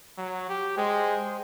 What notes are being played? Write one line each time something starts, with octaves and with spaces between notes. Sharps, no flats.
F#3
G4
G#3 G#4 C5 G5